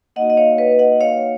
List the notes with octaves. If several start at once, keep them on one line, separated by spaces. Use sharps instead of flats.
A#3 D#4 F#4 D#5 F#5
D#5
C#5 F5
B4 D#5
D#5 F#5
C#5 F5